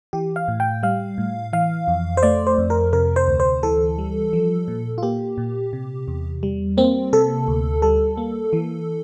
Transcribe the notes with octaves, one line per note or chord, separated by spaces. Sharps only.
E3 G4
F5
A2
G5
G3 F5
A2
E3 F5
F2
C5
A3 D5
C5
F2
A#4
C3 A#4
C5
D2
C5
E3 A4
G3
F3
A#2
F4
A#3 G4
A#2
C3
E2
G3
A#3 C4
C3 A4
D2
G3 A4
A#3
E3